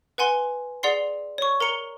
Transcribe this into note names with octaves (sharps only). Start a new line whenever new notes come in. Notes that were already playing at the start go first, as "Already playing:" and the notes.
B4 F#5 G#5 C6
G#4 D5 F#5 C6 C7
C#5 C#6
A#4 A#5 C#7 G7